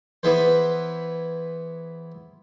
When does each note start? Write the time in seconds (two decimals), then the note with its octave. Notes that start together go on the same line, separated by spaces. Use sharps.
0.23 E3 B3 E4 G#4 B4 C5